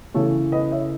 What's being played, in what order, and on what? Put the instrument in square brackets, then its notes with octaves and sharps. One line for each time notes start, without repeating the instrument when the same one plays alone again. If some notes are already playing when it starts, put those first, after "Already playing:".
[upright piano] C#3 E3 A3 A4 C#5
B4 D#5
C#5 E5